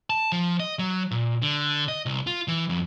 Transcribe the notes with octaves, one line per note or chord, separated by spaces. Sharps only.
A5
F3
D#5
F#3
A#2
D3
D#5
C2
F4
E3
F2